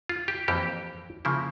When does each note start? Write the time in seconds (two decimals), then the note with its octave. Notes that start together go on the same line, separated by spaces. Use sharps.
0.09 F4
0.28 G4
0.48 F2 E3 A#3 G4
1.25 C#3 F3 A#3 E4